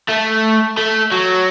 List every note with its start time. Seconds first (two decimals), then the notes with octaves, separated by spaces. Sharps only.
0.09 A3
0.78 A3
1.12 F#3